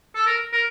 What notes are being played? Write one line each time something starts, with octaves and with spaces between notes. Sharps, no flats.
A4
A#4
A#4